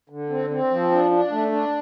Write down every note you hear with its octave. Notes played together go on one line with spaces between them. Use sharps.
D3
C4
C4
F3
D4
D4
A3
D4